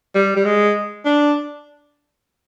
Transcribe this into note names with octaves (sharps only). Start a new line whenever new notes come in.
G3
G3
G#3
D4